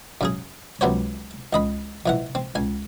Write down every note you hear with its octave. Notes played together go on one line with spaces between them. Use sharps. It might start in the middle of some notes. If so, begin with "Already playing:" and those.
F#2 C#3 G#4
C#2 C3 F#3 B3 C5 C#5
C#2 D#5 B5
F2 E3 F#5
C4
C#2 G#5